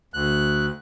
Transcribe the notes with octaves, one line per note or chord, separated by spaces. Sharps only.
D2 F#6